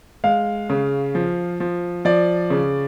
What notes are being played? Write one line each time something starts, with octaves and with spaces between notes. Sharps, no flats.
G#3 F5
C#3
F3
F3
F3 D5
C#3